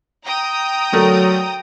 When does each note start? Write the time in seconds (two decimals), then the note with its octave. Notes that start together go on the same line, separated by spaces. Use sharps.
0.24 G5 A#5 D#6
0.93 D3 F#3 A3 A#4